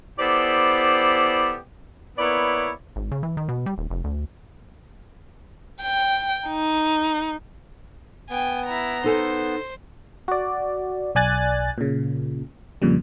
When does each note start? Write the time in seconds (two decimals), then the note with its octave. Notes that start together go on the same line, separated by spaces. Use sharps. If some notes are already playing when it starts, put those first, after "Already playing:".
0.19 B3 E4 G4 A4 C5 D5
2.19 A#3 B3 E4 C#5 D5
2.96 G#1
3.12 C#3
3.23 E3
3.37 D#3
3.48 B2
3.66 G3
3.78 D#1
3.90 F1
4.04 D2
5.82 G5
6.49 D#4
8.30 B3 G5 G#5
8.66 E4 A#5
9.04 D#4 A4 C5 G#5
10.28 F#4 D5
11.15 B1 D5 G#5 F#6 A6
11.78 A#2 C#3
12.82 F2 A#2 C#3 G3